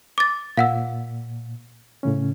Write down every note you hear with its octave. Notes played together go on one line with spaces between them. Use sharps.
D6 A6
A#2 F5 F#5 E6
A2 C#3 C#4